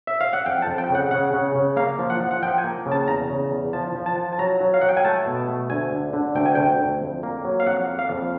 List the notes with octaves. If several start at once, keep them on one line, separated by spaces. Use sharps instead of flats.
E5
F5
F#5
F2 G5
A5
F2
G5
C#3
F#5
C#3 F#5
C#3
C#3
A#3 F5
F3
F#5
F3
F#5
F3 G5
G#5
A#3
C#3
A5
E2 A#5
C#3
E2
F3 A5
F3
A5
F3
A5
F#3 A#5
F#3
F5
F#3 F#5
G5
G#5
A3 A5
B2
A3
D2 G#5
D3
D3
D2 G5
G#5
D2 G5
D2
F2
A#3
F#3
F5
F2 F#5
A#3
F5
F2